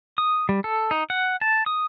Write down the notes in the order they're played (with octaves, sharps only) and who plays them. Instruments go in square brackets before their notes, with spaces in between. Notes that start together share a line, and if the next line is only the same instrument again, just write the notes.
[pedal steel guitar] D#6
G3
A4
D#4
F#5
A5
D#6